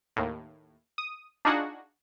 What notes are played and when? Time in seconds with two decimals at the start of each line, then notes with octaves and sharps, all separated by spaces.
0.16 D#2 A2
0.98 D#6
1.45 D4 D#4 F4 F#4 G#4 F#5